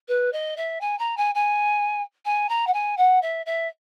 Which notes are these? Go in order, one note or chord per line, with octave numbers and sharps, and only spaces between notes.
B4
D#5
E5
G#5
A#5
G#5
G#5
G#5
A#5
F#5
G#5
F#5
E5
E5